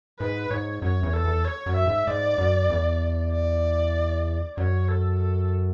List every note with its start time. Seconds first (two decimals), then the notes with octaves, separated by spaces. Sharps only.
0.19 G#2 B4
0.51 G#2 C#5
0.82 F#2 C#5
1.03 E2
1.13 A4
1.24 E2
1.45 C#5
1.66 F#2
1.76 E5
1.86 G#2
2.07 G#2 D5
2.38 F#2
2.70 E2
3.32 D5
4.57 F#2 C#5
4.89 A4
5.20 A4